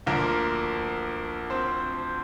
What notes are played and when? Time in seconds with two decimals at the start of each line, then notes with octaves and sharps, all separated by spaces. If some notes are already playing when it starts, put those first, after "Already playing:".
0.06 D2 D3 F3 A#3 A#4
1.50 C4 C5